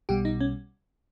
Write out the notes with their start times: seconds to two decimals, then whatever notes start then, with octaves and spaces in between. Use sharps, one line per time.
0.09 B1 B2 G3 G4
0.25 D#4
0.40 C#4